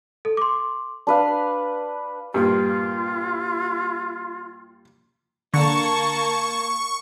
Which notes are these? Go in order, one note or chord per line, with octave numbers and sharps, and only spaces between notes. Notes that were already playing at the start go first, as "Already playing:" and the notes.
A4
C6 D6
D4 B4 F5
G2 A#2 F4
D3 A#3 A5 C#6 G#6